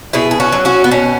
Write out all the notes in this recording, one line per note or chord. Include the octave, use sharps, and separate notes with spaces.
B2 E4 G#4
G#4
C#4 F#4
F#3
C#4 F#4
B3
B2 C#4